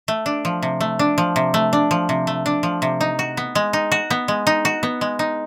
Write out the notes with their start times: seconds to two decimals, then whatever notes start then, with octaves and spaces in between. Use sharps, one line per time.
0.08 A3
0.26 D4
0.45 F3
0.62 C3
0.81 A3
0.99 D4
1.18 F3
1.36 C3
1.54 A3
1.73 D4
1.91 F3
2.09 C3
2.27 A3
2.46 D4
2.63 F3
2.82 C3
3.01 D#4
3.19 F#4
3.37 B3
3.55 G#3
3.73 D#4
3.92 F#4
4.10 B3
4.28 G#3
4.47 D#4
4.65 F#4
4.83 B3
5.01 G#3
5.19 D#4